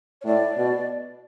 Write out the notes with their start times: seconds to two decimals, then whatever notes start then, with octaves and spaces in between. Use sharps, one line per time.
0.21 C#5
0.25 A2 D5
0.57 B2